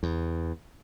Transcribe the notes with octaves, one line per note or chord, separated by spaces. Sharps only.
E2